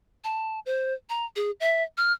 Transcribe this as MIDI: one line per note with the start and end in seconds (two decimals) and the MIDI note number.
0.24 0.60 81
0.66 0.94 72
1.10 1.26 82
1.36 1.51 68
1.60 1.83 76
1.97 2.13 89